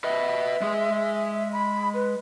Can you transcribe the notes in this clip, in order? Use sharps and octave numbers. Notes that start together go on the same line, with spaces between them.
B4 D#5 E5
G#3 G#4
B5
B4